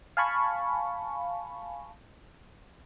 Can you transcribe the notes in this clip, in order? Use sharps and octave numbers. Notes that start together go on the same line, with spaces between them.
F5 G#5 A5 B5 C#6